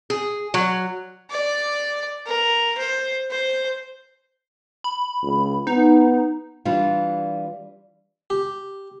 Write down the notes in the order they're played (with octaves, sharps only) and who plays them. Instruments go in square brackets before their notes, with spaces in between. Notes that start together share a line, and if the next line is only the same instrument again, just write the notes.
[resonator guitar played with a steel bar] G#4
F#3
[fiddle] D5
A#4
C5
C5
[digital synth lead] B5
[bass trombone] C#2
[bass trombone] B3 [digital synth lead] D#4
[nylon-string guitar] E3 G3 D4 F4
[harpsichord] G4